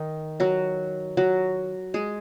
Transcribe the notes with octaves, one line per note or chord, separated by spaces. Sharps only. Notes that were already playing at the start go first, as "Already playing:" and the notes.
Already playing: D#3 D#4
F#3 F#4
F#3 F#4
G#3 G#4